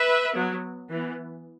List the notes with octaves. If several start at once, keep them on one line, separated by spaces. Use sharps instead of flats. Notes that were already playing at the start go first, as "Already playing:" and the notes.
Already playing: B4 E5
F#3 B3
E3 B3